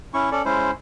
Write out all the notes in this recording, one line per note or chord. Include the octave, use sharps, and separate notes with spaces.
C#4 E4 C#6
C#4 A4 D5
G#3 C#4 E4 C5